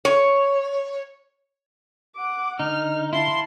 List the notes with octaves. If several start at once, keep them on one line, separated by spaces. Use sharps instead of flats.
C#5
F#5 D6
D3 D#4 F6
E4 F5 A5 C6